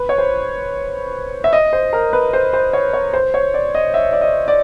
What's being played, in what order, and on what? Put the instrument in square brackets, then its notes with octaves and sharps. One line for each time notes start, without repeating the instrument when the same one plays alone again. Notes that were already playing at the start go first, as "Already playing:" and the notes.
Already playing: [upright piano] B4
C#5
C5
E5
D#5
C5
A#4
B4
C5
C5
C#5
C#5
C5
C#5
D5
D#5
E5
D5
D#5
D5